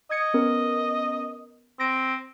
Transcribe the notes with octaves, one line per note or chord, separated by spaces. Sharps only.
D#5 D#6 G#6 C#7
B3 C#4 A#4
C4 A#6 D7